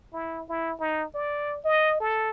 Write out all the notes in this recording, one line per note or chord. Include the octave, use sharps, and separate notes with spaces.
E4
E4
D#4
D5
D#5
A4